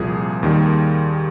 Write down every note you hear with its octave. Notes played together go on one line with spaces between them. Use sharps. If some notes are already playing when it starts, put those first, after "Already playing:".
Already playing: C2 A#2 F3 A#3 G#4
D#2 D#3 G3